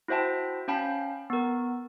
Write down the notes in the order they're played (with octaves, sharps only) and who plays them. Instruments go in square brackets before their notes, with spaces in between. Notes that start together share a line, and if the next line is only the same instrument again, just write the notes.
[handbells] E4 F#4 C5 E5 G5 A5
C#4 F5 G5 A5 B5
B3 A#4